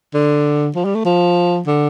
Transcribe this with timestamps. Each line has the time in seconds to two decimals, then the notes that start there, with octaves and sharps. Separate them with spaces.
0.14 D3
0.76 F3
0.85 G3
0.95 A3
1.05 F3
1.67 D3